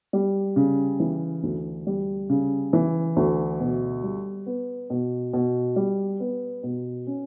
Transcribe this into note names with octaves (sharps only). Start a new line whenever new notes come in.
G3
C#3
E3
D2
G3
C#3
E3
D2
B2
G3
B3
B2
B2
G3
B3
B2
C#4